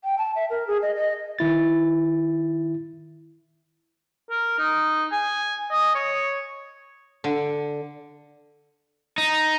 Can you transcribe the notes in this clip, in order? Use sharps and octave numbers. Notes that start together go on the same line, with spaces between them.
G5
A5
E5
A#4
G#4
D#5
D#5
D#3 E4 A6
A#4
D#4
G#5
D#5
C#5
D3
D#4